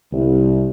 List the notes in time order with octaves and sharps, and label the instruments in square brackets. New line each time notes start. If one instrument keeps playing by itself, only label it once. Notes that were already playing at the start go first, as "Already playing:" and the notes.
[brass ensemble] C2